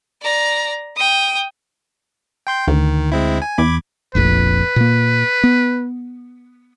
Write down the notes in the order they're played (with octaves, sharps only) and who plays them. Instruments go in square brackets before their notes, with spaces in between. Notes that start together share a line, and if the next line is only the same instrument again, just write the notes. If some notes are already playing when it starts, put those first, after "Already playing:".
[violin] D5 A#5
G5 D#6
[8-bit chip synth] G5 C6 G6
[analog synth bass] D2 [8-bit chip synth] D#3
[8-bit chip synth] G#3 C4 E4
G#5
[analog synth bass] E2 [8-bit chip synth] B5 D6 G#6
[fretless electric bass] F1 A#1 F2 [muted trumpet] B4
[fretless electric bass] A#2 A#3
B3